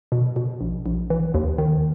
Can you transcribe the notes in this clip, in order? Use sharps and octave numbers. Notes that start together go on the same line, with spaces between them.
B2
B2
A#1
A#1
E3
D#2
D#3